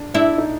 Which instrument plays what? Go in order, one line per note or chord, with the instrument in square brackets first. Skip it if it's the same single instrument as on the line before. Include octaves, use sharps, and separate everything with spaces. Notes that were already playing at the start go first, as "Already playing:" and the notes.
Already playing: [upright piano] D4
[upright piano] D4 [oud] E4
[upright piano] D#4